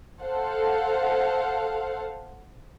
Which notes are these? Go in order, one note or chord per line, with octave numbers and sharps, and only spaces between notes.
A4 C5 F5 F#5